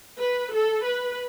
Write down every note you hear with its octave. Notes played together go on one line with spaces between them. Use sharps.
B4
A4
B4